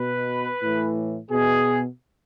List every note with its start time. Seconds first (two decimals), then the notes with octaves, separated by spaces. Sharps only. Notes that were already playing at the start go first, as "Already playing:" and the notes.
Already playing: B2 B4
0.62 A2 E3
1.30 B2 G#4